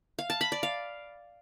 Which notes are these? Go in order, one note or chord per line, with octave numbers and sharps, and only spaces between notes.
F5
A5
B5
D5
F5